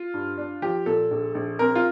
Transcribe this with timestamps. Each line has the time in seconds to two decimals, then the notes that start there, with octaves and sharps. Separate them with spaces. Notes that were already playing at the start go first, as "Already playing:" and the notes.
Already playing: F4
0.14 G2
0.38 D4
0.62 F3 G4
0.86 A#2 A4
1.11 A#1
1.35 A#1
1.59 C4 A#4
1.75 F4